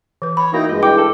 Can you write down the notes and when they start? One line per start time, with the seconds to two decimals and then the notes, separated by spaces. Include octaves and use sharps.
0.22 E3 B4
0.37 C#5 B5
0.54 A#3 D#4 E4 F#4 G5
0.69 G2 G#3 F4 D#5
0.83 E4 G5 D6
0.98 A4